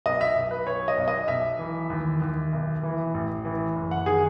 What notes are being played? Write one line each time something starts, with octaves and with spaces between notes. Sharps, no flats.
B1 D#5
E5
B1
B4
B1 C#5
D#5
B1
D#5
B1 E5
E3
D#2
D#2
B1
E3
A1
E3
F#1
F#5
D#3 G#4